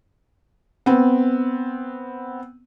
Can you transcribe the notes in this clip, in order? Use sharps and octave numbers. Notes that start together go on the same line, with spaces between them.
B3 C4